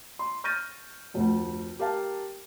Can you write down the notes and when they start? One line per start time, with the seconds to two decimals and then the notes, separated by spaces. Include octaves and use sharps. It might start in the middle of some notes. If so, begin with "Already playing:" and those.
0.19 C6
0.44 C#6 F6 G6 A6 A#6 D#7
1.14 F1 D2
1.79 G4 A#4 F5 A5